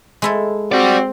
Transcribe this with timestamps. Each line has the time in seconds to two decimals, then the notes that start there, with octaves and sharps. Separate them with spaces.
0.22 G#3 E4 A4
0.72 C4 F#4 G4 D5